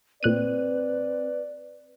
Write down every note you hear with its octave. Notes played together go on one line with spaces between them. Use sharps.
A#2 C4 B4 D5 F#6 D#7